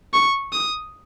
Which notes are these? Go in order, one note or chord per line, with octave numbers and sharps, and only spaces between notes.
C#6
D#6